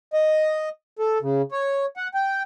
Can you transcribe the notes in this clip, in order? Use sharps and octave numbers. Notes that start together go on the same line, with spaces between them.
D#5
A4
C#3
C#5
F#5
G5